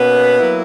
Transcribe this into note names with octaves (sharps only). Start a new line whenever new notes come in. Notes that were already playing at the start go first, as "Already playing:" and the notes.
Already playing: B2 A#3 B3 C#4 B4
F#3 A#3 E4